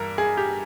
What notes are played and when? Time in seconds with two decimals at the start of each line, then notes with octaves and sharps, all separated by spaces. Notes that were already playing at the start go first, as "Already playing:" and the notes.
Already playing: G2 E3 A#4
0.18 G#4
0.37 G4